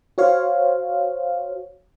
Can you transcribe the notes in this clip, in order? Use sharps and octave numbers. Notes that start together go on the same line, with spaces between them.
F#4 C5 C#5 F5